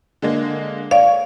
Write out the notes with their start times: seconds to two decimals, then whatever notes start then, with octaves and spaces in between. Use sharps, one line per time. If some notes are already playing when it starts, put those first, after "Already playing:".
0.22 D3 G#3 A#3
0.91 C#5 D5 F5